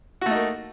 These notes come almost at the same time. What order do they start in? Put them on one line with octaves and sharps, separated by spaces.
F#4 A3 D#4 A#3